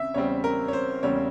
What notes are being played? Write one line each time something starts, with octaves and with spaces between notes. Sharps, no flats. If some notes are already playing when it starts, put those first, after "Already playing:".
Already playing: C#3 C4 E5
E2 C#3 G3 C4 C#5
A#4
C#5
C5
E2 C#3 G3 C4 C#5